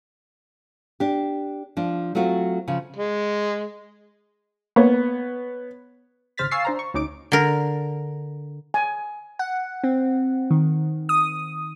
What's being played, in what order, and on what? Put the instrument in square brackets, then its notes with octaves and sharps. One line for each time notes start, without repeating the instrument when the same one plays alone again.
[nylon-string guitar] D4 G4
F3 D4
F#3 A3 C4 F4 F#4
C#3 F3
[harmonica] G#3
[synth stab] A#3 [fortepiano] B3 C#5
[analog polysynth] G#1 C#3 C5 F6 A6 B6
F5 G#5 C#6 E6 A6 C7
D4 C5 A#5
C#6
D2 C#4 D#4 D6 D7
[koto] D3 A#4
[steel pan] G#5
[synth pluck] F#5
C4
D#3
D#6